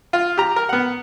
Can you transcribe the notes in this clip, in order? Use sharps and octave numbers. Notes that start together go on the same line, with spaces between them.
F4
G4 A#5
A#4
B3 F#5